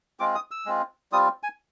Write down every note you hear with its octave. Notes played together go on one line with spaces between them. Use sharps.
G#3 C4 F4 D6
D#6
E6
G#3 C4 F4
G3 C4 F4 D#6
G#5